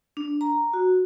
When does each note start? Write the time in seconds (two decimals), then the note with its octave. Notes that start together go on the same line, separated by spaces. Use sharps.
0.17 D4
0.41 A#5
0.73 F#4